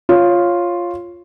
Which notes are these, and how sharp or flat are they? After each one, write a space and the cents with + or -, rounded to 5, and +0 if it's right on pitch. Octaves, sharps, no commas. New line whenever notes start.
F4 +0 C#5 -10